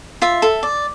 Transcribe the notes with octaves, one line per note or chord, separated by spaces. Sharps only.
F4 E5
A4
D5